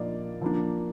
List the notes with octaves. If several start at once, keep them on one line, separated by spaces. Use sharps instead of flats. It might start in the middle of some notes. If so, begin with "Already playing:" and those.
Already playing: A#2 F3 A#3 D4 D5 D#5 F5
F3 A#3 D4